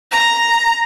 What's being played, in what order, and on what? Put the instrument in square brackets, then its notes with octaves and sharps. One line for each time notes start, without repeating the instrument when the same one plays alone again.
[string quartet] A#5